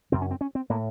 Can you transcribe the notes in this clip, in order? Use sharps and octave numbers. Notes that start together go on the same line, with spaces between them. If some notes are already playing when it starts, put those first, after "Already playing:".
F#2 C#3 C4
C#4
C4
C#4
C4
A2 A#3